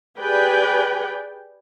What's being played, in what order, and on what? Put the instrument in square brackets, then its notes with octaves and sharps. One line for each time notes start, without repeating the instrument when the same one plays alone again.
[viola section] G4 G#4 B4 D5 G5 G#5